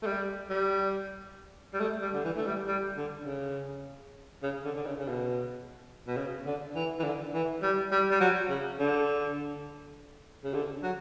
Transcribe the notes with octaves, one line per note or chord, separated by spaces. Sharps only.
A3
G3
G3
G3
A3
G3
D3
E3
A3
G3
G3
D3
C#3
C#3
D3
D3
C#3
C#3
B2
B2
C#3
D3
E3
E3
D3
E3
G3
G3
G3
F#3
C#3
D3
C#3
D3
F#3